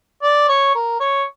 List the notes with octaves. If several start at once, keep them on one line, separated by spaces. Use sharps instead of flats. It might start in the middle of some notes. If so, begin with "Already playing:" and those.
D5
C#5
A#4
C#5